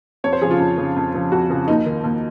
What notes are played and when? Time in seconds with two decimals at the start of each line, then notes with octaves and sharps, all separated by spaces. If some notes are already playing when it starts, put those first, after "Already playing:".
0.24 F2 C#5
0.33 C5
0.41 C#3 F3 G#4
0.51 F4
0.60 F2
0.78 C#3 F3
0.96 F2
1.14 C#3 F3
1.32 F2 F#4
1.50 C#3 F3
1.68 D#2 D#4
1.86 D#3
2.04 D#2